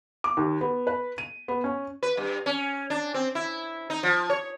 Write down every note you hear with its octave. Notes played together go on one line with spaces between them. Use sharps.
D6
D#2
B3
B4
D#7
B3
C#4
B4
G2
C#4
D4
C4
E4
D#4
F3
C#5